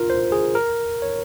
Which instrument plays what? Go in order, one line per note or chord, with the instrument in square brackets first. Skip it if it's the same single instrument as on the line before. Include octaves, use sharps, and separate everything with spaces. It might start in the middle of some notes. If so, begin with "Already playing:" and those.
Already playing: [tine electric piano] F4 A#4
C5
G#4
A#4
C#5